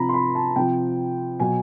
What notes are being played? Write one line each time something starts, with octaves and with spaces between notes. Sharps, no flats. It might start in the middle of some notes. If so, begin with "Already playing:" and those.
Already playing: C3 F3 A#5 B5
C6
B5
A5
C3 F3 G5
B2 F#3 G#5